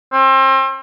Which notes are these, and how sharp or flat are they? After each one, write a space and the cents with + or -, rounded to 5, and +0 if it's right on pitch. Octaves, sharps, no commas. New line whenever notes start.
C4 +35